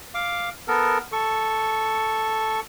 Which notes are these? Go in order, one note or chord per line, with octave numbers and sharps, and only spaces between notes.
F5 D6
B3 A4 A#4
A4 C#6